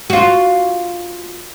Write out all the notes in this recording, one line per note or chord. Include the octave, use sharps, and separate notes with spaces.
F4 F#4